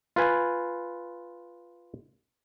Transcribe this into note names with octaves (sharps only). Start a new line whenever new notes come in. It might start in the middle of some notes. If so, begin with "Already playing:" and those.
F4 B4 G#5